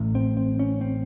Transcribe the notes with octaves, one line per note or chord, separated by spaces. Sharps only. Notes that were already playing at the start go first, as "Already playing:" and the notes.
Already playing: A1 A2
C4
C4
C#4
C4